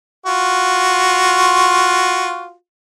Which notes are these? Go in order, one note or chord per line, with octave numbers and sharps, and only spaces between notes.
F4 F#4